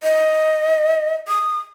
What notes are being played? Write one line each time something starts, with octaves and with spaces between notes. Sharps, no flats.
D#5
D#6